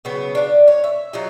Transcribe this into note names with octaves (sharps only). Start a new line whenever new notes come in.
C#3 F#3 B3
D4 F5
C#5
E5
F#3 D#4 F4